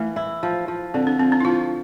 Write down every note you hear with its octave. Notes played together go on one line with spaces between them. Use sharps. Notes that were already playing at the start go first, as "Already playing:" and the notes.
Already playing: E3 A3 A#3
E4
F3
F3
D3 C4
D4
F3 C4
D4
E4
F3 F4